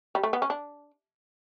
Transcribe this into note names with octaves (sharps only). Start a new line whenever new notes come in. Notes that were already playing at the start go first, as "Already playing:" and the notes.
G3
A3
B3
C#4
D4